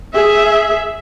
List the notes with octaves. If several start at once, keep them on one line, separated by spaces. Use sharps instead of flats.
G#4 E5